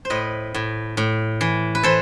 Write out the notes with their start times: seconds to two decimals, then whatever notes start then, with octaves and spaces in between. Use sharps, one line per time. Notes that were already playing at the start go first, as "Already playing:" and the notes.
0.05 C5
0.10 A2 B4 D#5
0.54 A2
0.97 A2
1.41 E3
1.75 B4
1.83 E3 A4 C5